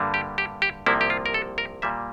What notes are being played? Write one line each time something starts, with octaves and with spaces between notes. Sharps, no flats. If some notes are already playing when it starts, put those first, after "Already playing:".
Already playing: G2 D3 G3 A#3
G4
G4
G4
C2 C3 F3 A#3 E4
G4
F4
A#4
A4
A#4
A#2 G3 A#3 E5